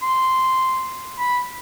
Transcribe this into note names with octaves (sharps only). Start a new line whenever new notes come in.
C6
B5